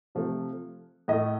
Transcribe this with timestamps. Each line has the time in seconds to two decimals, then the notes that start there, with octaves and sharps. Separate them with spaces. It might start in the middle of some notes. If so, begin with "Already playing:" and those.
0.15 C3 F3 A3
1.08 A2 A3 D#5